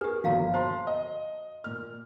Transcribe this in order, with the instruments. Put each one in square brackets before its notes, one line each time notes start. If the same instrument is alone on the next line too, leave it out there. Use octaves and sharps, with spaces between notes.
[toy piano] G4 B4 [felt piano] G#4 A#4
[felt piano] G1 A#2 F3 [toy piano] F#4 F5 A#5
[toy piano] C5 [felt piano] A5 A#5 C6
[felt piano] D#5
A#2 F6